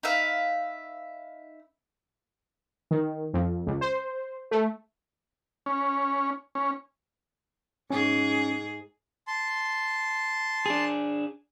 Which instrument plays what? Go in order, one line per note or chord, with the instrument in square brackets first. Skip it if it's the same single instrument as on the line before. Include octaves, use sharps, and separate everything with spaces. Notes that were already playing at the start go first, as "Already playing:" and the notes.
[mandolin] D#4 B4 E5 F5
[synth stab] D#3
F2
C#2
C5
A3
[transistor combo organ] C#4
C#4
[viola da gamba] G#2 G#4 [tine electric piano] C#4
[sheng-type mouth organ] A5 C6
[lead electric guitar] D4 G#4